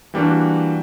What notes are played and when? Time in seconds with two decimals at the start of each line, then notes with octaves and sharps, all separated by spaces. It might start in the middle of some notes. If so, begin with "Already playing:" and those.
0.14 E3 G3 A#3 D4 F#4